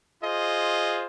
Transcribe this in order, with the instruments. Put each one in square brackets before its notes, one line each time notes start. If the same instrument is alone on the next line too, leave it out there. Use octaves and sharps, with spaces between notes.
[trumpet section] F4 G#4 C5 D#5